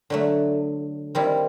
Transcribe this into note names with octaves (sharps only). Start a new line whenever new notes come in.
D3 F#3 A3
D#3 G3 C4 E4